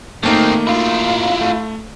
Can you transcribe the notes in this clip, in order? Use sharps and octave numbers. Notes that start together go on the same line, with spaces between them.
D#3 A3 A#3 C4 D#4
E4 F4
A3